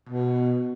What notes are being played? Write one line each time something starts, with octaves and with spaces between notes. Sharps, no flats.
B2